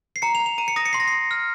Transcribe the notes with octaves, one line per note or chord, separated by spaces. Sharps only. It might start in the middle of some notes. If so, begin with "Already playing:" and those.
C7
A#5 C#7
F7
A#5
F7
A#5 D#7
C#7
D#6 A#6
C#7
C6 C7
A#6
C6 C7
F6